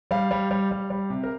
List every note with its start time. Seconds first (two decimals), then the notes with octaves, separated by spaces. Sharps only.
0.11 G3 F5
0.31 G3
0.51 G3
0.71 G3
0.90 G3
1.10 C3
1.23 A#4